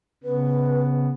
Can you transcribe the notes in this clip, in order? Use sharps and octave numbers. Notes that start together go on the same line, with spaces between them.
C#3 B3 B4